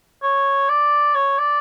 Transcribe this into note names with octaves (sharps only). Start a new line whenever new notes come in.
C#5
D5
C#5
D5